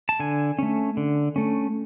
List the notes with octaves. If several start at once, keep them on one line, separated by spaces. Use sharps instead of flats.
A5
D3 G#5
A3 C#4
D3
A3 C#4